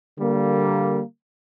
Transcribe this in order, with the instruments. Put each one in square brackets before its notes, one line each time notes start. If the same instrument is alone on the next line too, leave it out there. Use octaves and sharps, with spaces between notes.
[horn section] D3 G3 A#3